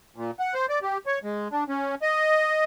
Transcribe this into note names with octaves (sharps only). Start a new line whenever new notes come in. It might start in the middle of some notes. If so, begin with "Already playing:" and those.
A#2
F#5
C5
D5
G4
C#5
G#3
D4
C#4
D#5